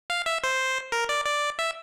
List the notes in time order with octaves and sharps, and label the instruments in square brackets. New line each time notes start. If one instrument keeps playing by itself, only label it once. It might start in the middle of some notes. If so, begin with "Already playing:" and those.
[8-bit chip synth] F5
E5
C5
A#4
D5
D5
E5